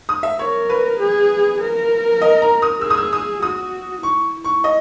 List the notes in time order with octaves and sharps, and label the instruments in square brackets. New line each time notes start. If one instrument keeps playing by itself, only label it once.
[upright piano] D#6
E5
[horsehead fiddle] A#4 [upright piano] C#5
[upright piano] B4
[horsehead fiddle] G#4
A#4
[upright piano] D#5
A#5
D#6
[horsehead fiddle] G#4 [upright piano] E6
[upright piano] D#6
E6
D#6
[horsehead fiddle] F#4 [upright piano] D#6
[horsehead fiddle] E4 [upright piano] C#6
[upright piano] C#6
D#5